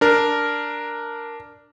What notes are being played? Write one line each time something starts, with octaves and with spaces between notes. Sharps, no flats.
D4 A#4